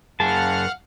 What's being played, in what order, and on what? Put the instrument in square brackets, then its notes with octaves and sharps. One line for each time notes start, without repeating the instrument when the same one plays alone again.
[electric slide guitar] F#2 G#4 [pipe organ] F5 F#5 F6 [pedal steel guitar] A5